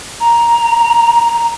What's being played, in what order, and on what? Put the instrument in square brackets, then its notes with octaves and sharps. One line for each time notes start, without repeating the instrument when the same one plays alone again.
[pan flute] A#5